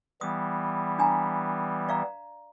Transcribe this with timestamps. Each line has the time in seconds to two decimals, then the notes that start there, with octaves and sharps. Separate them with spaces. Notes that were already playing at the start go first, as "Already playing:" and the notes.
0.21 E3 G3 B3 D#6
0.99 D4 G#5 A#5
1.89 D5 F5 A#5